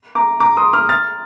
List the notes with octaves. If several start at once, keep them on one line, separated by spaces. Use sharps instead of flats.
A#5 D6
A#5 D6
C6 D#6
D6 F6
F6 A6